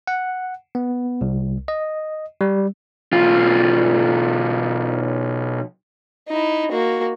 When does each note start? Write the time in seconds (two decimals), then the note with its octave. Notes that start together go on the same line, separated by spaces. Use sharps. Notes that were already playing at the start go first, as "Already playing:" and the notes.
0.07 F#5
0.75 B3
1.21 C2
1.68 D#5
2.41 G3
3.13 B1 F4
6.28 D#4 E4
6.71 A#3 F#4